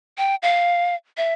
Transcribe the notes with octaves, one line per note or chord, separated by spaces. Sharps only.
G5
F5
E5